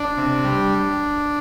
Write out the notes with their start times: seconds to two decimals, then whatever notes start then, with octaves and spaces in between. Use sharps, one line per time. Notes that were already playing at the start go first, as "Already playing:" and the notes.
Already playing: D4
0.18 C3
0.45 G3